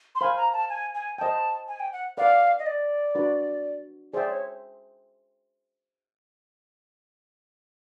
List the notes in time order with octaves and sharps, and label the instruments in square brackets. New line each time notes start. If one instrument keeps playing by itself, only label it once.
[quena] C6
[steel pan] C5 F5 G#5 [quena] B5
[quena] A#5
A5
G#5
G#5
[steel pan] C5 D#5 G5 [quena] A5
[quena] G#5
G5
F#5
[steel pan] B4 D5 F#5 [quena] F5
[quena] D#5
D5
[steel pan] D4 F#4 B4
[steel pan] G#4 C5 E5 G5 [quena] D5
[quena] C#5